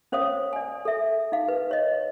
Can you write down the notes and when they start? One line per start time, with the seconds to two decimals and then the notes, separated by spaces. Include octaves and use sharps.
0.12 C#4 C5 C#5 F5 D#6
0.53 D5 G#5
0.85 A4 E5
1.32 D#4 F5
1.48 B4
1.71 C#5 D#5